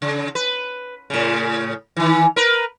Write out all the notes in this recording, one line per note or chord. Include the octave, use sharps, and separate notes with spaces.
C#3
B4
A2 C#3
D#3 E3
A#4 B4